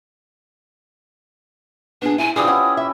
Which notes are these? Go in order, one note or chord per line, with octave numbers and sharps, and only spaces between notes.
B3 D4 G#4
E4 G#5
D3 E3 F3 D4 G4 G#4 D#6
C#4 E4 F#5
E5